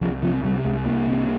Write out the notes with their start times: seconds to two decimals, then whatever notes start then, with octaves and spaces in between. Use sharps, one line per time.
0.01 C2 F3
0.22 C3 F3
0.44 C3 G3
0.64 C2 G#3
0.85 C2 A#3
1.07 C3